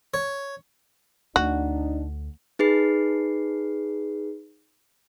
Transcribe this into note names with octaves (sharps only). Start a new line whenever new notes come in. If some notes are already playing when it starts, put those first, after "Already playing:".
C#5
D2 D4 D#4 F#4
D#4 G#4 B4 C7